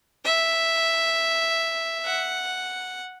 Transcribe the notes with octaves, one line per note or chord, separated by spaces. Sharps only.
E5
F#5